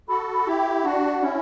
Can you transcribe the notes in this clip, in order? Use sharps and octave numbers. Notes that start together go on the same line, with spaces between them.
F#4 A4 B5
B5
E4 G4
G5
D4 F#4 F#5
C#4 E4